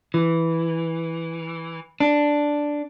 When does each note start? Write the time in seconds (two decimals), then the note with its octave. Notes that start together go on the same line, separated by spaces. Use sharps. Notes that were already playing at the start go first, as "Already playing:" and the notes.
0.14 E3
2.00 D4